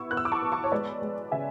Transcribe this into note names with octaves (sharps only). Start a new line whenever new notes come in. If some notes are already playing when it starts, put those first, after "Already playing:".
Already playing: B3 E4 C#6 E6
B3 F#6
E6
D6
A5 C#6
B3
A5 C#6
C#5
G#3 B4 D5
G#3
C#3 E5 G#5